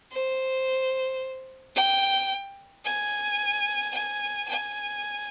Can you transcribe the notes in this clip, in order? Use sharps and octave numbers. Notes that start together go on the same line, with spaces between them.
C5
G5
G#5
G#5
G#5